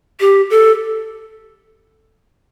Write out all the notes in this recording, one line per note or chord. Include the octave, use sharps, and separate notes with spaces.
G4
A4